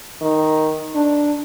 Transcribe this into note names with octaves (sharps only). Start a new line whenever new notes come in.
D#3
D4